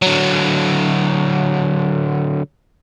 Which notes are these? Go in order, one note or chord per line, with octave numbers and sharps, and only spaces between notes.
D3 F#3